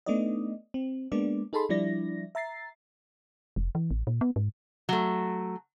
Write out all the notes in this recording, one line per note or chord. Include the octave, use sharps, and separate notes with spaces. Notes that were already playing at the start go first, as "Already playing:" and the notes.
A3 B3 D4 D#4 D5 D#5
C4
G#3 A#3 B3 D4 D5
D#4 G#4 A4 A5 B5 C6
F3 G3 D4 E4 D5 A#6
E5 A#5 A6 C7
F1
E3
A1
A#2
B3
G#2
F#3 A3